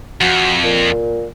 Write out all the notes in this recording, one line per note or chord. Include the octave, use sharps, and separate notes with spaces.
F2 F#4
A#2